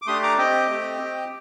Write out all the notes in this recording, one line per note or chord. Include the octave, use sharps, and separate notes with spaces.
D6
A3 D4 G4 C6 D#6
A#5 D6
C4 G4 D#5 G5
A3 C4 G4
C4
G4